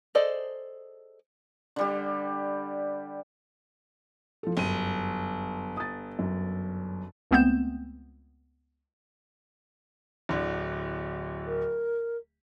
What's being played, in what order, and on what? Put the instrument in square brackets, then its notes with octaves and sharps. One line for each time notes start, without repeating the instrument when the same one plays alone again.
[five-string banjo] G#4 A4 C5 D5 D#5
[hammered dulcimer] D3 G3 G4
[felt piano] F3 A4
[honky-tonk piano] G1 [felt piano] F#2 D#7
[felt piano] D#6 A6
F#2
[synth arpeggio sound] C#2 A3 B3 C4 G6 E7
[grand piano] D1 D3
[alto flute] A#4